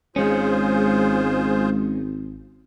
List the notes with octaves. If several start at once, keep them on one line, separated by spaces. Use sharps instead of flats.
G#1 G#3 C#4 F4 G#4 C5